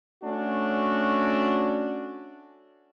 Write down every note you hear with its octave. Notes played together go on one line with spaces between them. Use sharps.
A3 C#4 D4 F#4